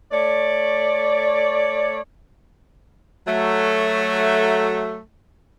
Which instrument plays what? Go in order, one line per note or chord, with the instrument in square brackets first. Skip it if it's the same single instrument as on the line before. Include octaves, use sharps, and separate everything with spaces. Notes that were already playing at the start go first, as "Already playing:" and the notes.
[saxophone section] A3 C#5 D5
F#3 A3